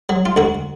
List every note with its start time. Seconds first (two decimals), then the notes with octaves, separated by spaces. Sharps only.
0.09 F#3
0.26 F4
0.36 D2 F#4